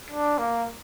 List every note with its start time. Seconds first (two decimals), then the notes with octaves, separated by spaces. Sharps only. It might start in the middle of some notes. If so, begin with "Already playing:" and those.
0.10 D4
0.38 A#3